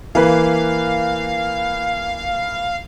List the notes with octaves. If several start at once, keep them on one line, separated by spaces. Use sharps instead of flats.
E3 A#3 B4 F5